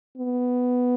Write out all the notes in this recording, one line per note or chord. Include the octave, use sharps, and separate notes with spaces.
B3